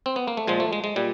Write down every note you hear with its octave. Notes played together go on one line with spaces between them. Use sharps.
C4
B3
A#3
A3
A#2 F3 G#3
A3
G#3
G#3
A#2 G3